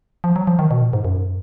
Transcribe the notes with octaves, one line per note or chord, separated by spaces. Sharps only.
F3
F#3
F3
D#3
B2
A#2
G#2
F#2